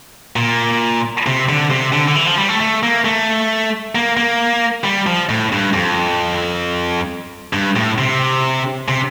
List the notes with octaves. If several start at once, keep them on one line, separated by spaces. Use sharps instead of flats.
A#2
C3
D3
C3
D3
D3
E3
F3
G3
A3
A3
A#3
A3
A#3
A#3
G3
F3
A2
G2
F2
G2
A2
C3
C3